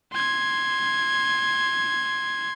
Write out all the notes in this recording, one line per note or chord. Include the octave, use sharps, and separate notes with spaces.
C6 G#6